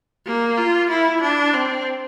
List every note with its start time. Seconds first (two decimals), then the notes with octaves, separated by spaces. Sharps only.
0.26 A#3
0.58 F4
0.90 E4
1.22 D4
1.54 C4